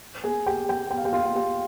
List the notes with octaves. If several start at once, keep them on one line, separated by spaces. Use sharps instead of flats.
G#4 G#5
G4 G5
G4 G5
G5
F5
G4 G5
F4 F5
F5
G4 G5